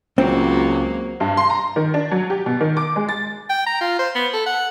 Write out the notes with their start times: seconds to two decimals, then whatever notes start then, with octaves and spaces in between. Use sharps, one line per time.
0.18 C#2 F#3 A#3 C4
1.20 G2
1.37 C6
1.50 A#5
1.76 D#3
1.94 D4
2.11 F#3
2.30 G4
2.46 B2
2.60 D#3
2.77 D6
2.96 G#3
3.09 A6
3.50 G5
3.66 A#5
3.81 F4
3.99 C5
4.15 B3
4.34 A4
4.46 F#5